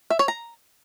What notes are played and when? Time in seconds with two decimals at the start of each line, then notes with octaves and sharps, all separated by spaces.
0.10 E5
0.19 C#5
0.28 A#5